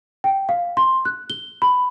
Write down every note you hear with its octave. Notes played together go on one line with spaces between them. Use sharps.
G5
F5
C6
F#6
G7
B5